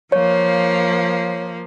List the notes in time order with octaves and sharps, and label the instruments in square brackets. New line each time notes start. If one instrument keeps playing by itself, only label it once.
[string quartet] F3 A#3 [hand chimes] C#5